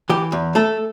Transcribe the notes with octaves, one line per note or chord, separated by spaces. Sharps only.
E3 G4
E2
A3 A4